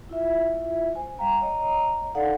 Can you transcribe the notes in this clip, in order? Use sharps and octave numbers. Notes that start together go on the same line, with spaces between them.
E4 F4 E5
C5 G#5
G3 F5 G5 A#5
C#5 D#5 A#5
D#4 A4 D5 F5 F#5